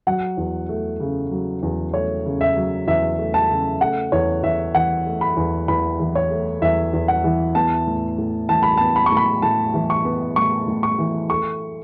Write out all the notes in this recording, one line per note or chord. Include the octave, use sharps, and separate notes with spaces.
F#3 F#5
E2
A3
C#3
F#3
E2
A3 C#5
C#3
E5
F#3
E2 E5
A3
A5
C#3
A3 F#5
E2 C#5
E2 E5
E3 F#5
A3
B5
E2
E2 B5
E3
C#5
A3
E2 E5
E2
F#5
E3
B3 A5
A2
A2
E3 A5
B5
B3 A5
B5
C#6
A2
B5
A2 A5
E3
C#6
B3
A2 C#6
A2
C#6
E3
A3 C#6